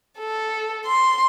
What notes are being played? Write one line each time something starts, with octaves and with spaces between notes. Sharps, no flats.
A4
C6